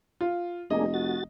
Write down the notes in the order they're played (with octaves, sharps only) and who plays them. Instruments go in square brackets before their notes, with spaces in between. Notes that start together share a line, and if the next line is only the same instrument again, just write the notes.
[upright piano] F4
[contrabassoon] F1 [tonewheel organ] A#3 D4 G#4 [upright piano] D#5
[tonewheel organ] F#4 A6